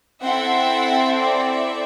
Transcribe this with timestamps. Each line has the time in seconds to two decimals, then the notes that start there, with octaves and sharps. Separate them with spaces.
0.23 C4 E4 A4 E5 F#5
1.21 D5 E5